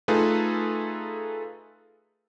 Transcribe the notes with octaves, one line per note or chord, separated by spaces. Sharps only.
A3 D#4 F4 G#4 A4 B4